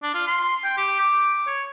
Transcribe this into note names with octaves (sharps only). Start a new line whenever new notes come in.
D4
F4
C6
G5
G4
D6
C#5